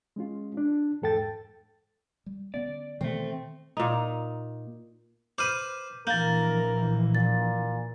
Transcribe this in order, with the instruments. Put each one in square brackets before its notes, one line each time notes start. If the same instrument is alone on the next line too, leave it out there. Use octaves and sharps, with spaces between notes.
[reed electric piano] G#3 C#4 F4
D4
E2 G#2 A4 G5 A6
[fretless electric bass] G3
[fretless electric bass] D3 B3 C#4 [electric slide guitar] D5
[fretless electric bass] B2 E3 B3 [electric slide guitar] D#3 A3 [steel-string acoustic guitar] C4
[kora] A#2 D#4
[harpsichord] B4 C5 [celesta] D6 F6 D#7
[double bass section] A#1 E3 [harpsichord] A#3 [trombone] A#4 [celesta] G6 A6
[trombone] A#2 [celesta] A6